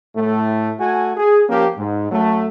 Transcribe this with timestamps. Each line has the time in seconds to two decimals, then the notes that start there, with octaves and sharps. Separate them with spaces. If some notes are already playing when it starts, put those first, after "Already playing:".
0.16 A2 A3
0.79 A3 F#4 G#5
1.17 G#4
1.49 F3 A#3 C#4 G4
1.78 G#2
2.11 F#2 F#3 A3